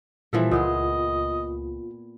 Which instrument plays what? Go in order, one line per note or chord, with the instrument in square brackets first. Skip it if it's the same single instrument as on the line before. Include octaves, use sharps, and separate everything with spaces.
[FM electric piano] A#2 G3 [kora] E3 F3 A4
[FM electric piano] C#2 [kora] A#2 B3 G#4 [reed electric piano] F4 [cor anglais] D#5